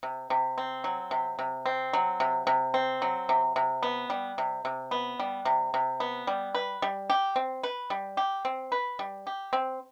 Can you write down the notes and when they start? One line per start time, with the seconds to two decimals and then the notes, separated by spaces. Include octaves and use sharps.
0.03 C3
0.30 C3
0.58 C4
0.84 F#3
1.11 C3
1.39 C3
1.66 C4
1.93 F#3
2.20 C3
2.47 C3
2.74 C4
3.02 F#3
3.29 C3
3.56 C3
3.83 B3
4.10 G3
4.38 C3
4.65 C3
4.91 B3
5.19 G3
5.45 C3
5.74 C3
6.00 B3
6.27 G3
6.54 B4
6.82 G3
7.10 G4
7.36 C4
7.63 B4
7.90 G3
8.17 G4
8.45 C4
8.72 B4
8.99 G3
9.27 G4
9.53 C4